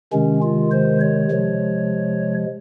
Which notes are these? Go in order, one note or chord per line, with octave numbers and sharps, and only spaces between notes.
C3 D#3 G#3 C#4
F4
C5
C#5
C3 F3 G#3